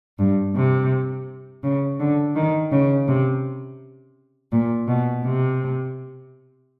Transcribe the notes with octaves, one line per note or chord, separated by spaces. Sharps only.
G2
C3
C#3
D3
D#3
C#3
C3
A#2
B2
C3